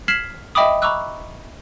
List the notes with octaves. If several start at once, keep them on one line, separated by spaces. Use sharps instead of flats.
F6 G#6 B6 C7 E7 F#7
D#5 E5 G5 B5 D6 D#6
A#5 B5 C#6 D6 E6 F#6